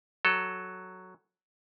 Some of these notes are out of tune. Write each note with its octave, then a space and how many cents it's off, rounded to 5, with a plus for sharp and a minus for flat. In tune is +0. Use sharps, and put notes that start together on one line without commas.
F#3 +0 A4 +0